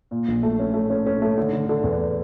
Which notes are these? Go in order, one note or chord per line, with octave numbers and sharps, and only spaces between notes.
A#2
A#1
A3
C#4
A3
C#4
C#4
A3
D3
D3
D3
E2